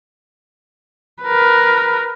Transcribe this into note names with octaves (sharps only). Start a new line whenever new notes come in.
A#4 B4